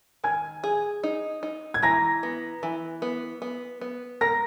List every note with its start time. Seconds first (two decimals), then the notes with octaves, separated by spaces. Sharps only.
0.24 D#3 G#5 G#6
0.64 G#4
1.03 D#4
1.43 D#4
1.74 G#6
1.83 E3 A#5 A#6
2.23 B3
2.63 E3
3.02 B3
3.42 B3
3.81 B3
4.21 A#4 A#5 A#6